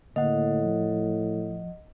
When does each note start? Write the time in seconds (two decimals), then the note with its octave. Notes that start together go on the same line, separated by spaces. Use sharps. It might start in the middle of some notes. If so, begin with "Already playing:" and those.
0.16 A2 D3 A#3 D#5 F#5
0.63 F3